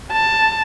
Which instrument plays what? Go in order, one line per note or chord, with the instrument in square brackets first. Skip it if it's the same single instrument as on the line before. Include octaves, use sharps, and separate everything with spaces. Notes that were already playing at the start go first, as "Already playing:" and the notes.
[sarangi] A5